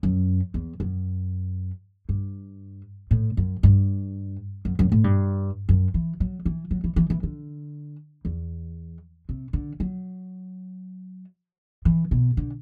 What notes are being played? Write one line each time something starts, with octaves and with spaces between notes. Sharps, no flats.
F#2
E2
F#2
G2
A2
F#2
G2
F#2
F#2
A2
G2
F#2
E3
F#3
E3
F#3
E3
E3
E3
D3
E2
C3
D3
F#3
E3
B2
D3